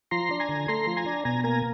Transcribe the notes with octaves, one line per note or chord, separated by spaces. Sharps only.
F3 A#5 C6
D4
G#5 A#5
D3
A3 A#5 C6
F3
G#5 A#5
D4
B2 G#5 A#5
A#3 G#5 A#5